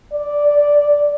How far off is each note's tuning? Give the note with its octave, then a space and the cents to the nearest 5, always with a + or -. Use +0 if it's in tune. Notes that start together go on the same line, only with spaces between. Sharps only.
D5 -5